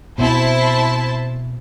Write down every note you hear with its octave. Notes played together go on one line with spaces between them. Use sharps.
B2 C4 E4 C5 A5